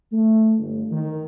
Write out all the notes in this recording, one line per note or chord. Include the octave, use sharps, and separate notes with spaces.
A3
G1
D#3